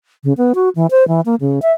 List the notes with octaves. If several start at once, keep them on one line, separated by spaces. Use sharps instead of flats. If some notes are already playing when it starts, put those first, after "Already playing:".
C#3
B3
F#4
E3
C5
E3
A#3
C#3
E5